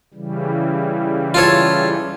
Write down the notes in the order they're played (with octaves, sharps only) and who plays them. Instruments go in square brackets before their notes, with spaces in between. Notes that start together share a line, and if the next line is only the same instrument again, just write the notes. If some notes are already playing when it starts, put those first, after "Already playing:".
[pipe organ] C#3 E3 G3
[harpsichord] F4 A4 C#5